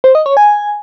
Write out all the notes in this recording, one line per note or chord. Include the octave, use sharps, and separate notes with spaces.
C5
D#5
C#5
G#5